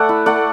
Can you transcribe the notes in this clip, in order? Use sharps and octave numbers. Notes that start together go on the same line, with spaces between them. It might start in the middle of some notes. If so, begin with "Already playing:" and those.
Already playing: A3 D5 F#5
E4
A3 D5 F#5